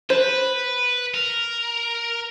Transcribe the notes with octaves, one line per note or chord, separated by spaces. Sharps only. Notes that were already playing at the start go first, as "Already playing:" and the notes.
B4 C5
A#4